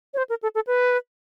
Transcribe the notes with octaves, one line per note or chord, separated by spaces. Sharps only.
C#5
C5
A#4
A4
A4
B4